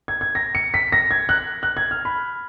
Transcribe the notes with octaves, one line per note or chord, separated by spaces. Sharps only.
G#6
G#6
A#6
C#7
B6
A#6
G#6
F#6
F#6
G#6
F6
B5